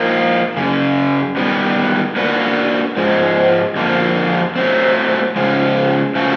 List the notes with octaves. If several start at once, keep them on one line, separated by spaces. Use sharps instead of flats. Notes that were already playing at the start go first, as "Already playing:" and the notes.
Already playing: F3 A#3 D#4
F#2 C#3
D#3 G3 B3
A#3 D4 F#4 B4
G#2 F3 G#3
F2 D3 F3 A#3
F#3 A3 C4
C#3 F3 G#3
C#3 F3 A3 C#4 F#4